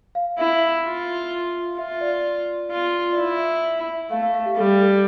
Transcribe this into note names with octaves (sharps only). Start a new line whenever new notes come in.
F5
E4 E5
F4
F4 E5
D5
F4
D5
E4 E5
A3 F5
F5
F5
G4
G3 A4
A4